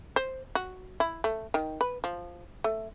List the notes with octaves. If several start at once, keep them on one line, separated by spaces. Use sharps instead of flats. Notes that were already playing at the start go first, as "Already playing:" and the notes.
C5
F#4
E4
A3
D#3
B4
F3
A3